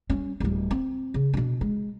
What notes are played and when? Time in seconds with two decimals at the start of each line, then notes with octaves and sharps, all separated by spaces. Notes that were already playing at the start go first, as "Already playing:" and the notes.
0.10 G3 C#4
0.40 D1 G3
0.71 C4
1.14 C#3
1.34 B2 D4
1.61 G#3